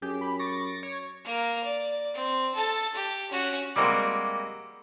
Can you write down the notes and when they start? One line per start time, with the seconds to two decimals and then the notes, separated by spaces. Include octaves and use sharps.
0.02 F#2 G4 G#4
0.21 B5
0.39 C#6 D6 A6 A#6
0.83 C#5
1.24 A#3 A#4
1.63 D5
2.14 C4
2.55 A4 A5
2.95 G4
3.31 C#4 F#4
3.76 G3 G#3 A#3 C4 F#4